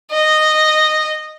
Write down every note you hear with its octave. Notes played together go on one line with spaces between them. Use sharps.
D#5